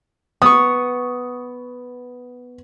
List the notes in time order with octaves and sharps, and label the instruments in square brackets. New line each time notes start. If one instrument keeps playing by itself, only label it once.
[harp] B3 C#6 [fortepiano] D#6